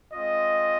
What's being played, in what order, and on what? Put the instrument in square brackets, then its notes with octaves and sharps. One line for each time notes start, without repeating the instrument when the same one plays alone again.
[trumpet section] G#3 C4 F4 D#5